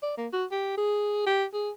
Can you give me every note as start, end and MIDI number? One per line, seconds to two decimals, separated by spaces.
0.03 0.13 74
0.17 0.27 58
0.33 0.45 66
0.51 0.76 67
0.78 1.26 68
1.26 1.44 67
1.54 1.70 68